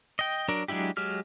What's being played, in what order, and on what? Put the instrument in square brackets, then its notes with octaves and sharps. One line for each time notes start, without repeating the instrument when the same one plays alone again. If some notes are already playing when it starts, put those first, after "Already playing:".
[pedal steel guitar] D#5 G5
F#3 D4 A#4
F#3 G#3 D4 E4 G4
F#3 G#3 G4 F6